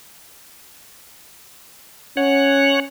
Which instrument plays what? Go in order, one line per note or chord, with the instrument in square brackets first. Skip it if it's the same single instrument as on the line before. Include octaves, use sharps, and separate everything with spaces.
[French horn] C#4 [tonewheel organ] C#5 F#5